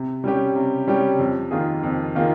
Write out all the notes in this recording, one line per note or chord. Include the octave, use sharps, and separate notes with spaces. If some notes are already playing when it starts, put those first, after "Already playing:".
Already playing: C3
G3 C#4 G4
C3
G3 C#4 G4
F2
D#3 A#3 F4 G#4
F2
D#3 A#3 F4 G#4